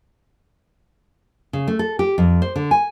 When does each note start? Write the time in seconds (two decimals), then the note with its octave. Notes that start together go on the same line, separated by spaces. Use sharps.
1.53 C#3
1.67 A3
1.79 A4
1.99 G4
2.18 F2
2.42 C5
2.56 D3
2.71 G#5